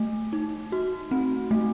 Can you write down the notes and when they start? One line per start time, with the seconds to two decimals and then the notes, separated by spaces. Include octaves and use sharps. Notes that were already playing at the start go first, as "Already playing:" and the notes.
Already playing: A3
0.33 D#4
0.72 F#4
1.11 C4
1.51 A3